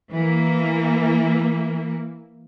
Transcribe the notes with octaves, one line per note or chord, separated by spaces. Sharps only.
E3 A#3